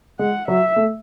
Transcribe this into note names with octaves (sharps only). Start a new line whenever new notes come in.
G#3 F#5
F#3 E5
A3